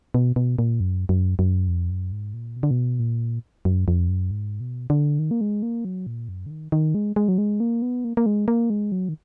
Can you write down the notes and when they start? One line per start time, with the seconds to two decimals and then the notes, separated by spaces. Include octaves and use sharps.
0.14 B2
0.36 B2
0.59 A#2
0.80 F#2
1.09 F#2
1.39 F#2
1.68 F2
1.90 F#2
2.12 G#2
2.34 A#2
2.56 B2
2.63 D3
2.71 B2
3.00 A#2
3.65 F#2
3.88 F2
4.09 F#2
4.31 G#2
4.60 B2
4.90 D3
5.19 D#3
5.31 A#3
5.41 G#3
5.63 A#3
5.85 F#3
6.07 A#2
6.29 F#2
6.46 D3
6.51 D#3
6.72 D#3
6.95 G#3
7.16 G#3
7.28 F#3
7.38 G#3
7.60 A#3
7.82 B3
8.04 A#3
8.17 A#3
8.26 G#3
8.48 A#3
8.70 G#3
8.92 F#3
9.09 D#3